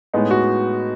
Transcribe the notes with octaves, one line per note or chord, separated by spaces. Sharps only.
A2 G#3 B3 D#4
F#4